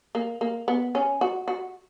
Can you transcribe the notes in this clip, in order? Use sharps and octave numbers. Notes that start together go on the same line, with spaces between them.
A#3
A#3
B3
C#4
F#4
F#4